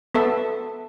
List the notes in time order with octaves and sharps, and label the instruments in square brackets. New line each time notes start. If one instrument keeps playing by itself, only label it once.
[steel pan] B3 A4 E5